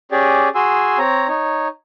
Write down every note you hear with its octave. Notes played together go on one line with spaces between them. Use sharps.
C#4 G4 G#4 D5
F#4 G#4 G#5 C6 E6
C4 C#5 A#5
D#4 C#5